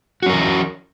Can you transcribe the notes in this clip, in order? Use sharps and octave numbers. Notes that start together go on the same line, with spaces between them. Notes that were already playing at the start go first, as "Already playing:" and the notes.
E3 C#4 F#4 A#4